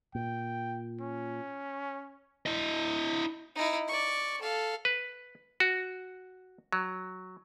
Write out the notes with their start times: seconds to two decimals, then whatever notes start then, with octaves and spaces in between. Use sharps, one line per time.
0.15 A#2 G5
1.01 C#4
2.46 E4 D#5
3.56 D#4 E4
3.88 D5 C#6
4.41 A4 F5
4.85 B4
5.60 F#4
6.73 F#3